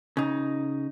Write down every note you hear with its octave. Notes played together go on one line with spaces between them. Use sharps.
C#3 D#4